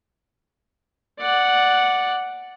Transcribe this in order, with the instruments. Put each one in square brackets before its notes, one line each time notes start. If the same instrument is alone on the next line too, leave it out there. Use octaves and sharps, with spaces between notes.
[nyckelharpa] D5 F#5